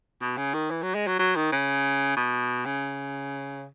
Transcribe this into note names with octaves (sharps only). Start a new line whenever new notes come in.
B2
C#3
D#3
E3
F#3
G#3
F#3
F#3
D#3
C#3
B2
C#3